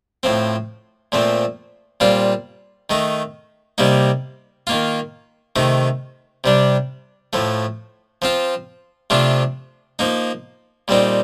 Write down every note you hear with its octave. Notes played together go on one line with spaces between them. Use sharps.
A2 F3 C4
A#2 F3 A3 C4
A#2 G3 C4 F4
D#3 A3 D#4
C3 G3 A#3 D#4
D#3 A#3 F4
C3 D#3 A3 D#4
C3 G3 D4
A2 F3 A3
F3 C4 F4
C3 F3 A3 D4 F4
F3 A#3 D#4
A#2 G3 C4 D#4